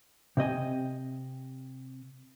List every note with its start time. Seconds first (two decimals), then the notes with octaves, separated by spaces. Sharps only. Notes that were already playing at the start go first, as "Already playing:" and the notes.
0.37 C3 C4 D#5 G#5